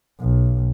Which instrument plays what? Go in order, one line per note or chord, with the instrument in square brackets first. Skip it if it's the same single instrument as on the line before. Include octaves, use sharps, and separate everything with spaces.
[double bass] B1